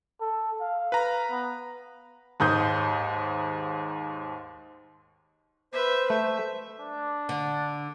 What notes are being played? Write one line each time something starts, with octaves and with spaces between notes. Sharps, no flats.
A4
F5
B4 A#5
B3
D#2 G#2 D#6 G6
B4 C5 E5
A3 E5
D4
D3